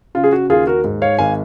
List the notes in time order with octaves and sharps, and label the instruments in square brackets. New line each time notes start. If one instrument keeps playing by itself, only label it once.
[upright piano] C#3 F4
G#4
F#4
D#2 F4 G#4
F#4 A#4
G#2
C#5 F5
G#1 F5 G#5